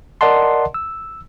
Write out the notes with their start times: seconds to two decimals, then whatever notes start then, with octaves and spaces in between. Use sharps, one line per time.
0.21 A#4 D5 D#5 F#5 A5 C6
0.74 E6